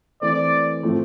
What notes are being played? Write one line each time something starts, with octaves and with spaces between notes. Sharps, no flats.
E3 A3 C4 D5
A2 F3 A3 C4